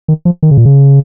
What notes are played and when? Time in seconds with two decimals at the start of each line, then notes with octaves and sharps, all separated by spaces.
0.08 D#3
0.25 F3
0.43 D#3
0.51 C#3
0.58 A#2
0.65 C#3